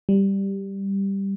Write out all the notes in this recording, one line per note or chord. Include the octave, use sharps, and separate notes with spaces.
G3